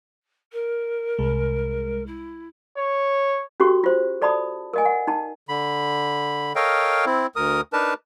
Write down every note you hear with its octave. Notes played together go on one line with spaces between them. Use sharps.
A#4
C2 G#3
E4
C#5
C#4 F#4 G4 A4 C#6
F4 C5
A4 D5 A5 B5 D#6
A#4 D#5 G#5
F#5
D#4 A5
D3 B5
A4 A#4 C#5 D#5 F5 G5
C4 E4
D2 A#4 D#6
D4 D#4 A#4 B4 A5